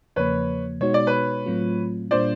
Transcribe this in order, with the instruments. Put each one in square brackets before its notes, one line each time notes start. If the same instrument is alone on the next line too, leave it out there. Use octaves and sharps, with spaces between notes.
[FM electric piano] E2 C#3 F3 A#3 [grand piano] B4 C#5
[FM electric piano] B2 G#3 B3 D#4 F#4 [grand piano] C#5
[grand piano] D5
B4 C#5
[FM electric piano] A2 F#3 A3 C4 F4
[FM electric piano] A#2 G3 A#3 D4 F4 [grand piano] C5 D5